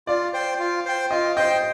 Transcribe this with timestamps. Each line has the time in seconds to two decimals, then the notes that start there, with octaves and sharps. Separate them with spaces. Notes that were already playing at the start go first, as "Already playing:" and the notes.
0.07 F4 D5
0.33 C5 G5
0.59 F4
0.85 C5 G5
1.11 F4 D#5
1.36 C5 D#5 G5